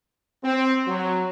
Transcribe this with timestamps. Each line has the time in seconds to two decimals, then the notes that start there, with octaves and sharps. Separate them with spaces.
0.44 C4
0.88 F#3